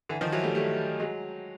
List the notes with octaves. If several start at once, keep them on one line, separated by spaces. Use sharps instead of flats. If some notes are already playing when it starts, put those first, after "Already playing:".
D3 E3
D#3 F3
E3 F#3
G3 A3
G3 A3
F#3 G#3